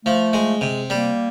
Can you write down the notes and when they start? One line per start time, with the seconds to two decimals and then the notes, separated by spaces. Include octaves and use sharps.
0.05 F3 A3
0.33 G#3
0.61 C3
0.90 G3 A#3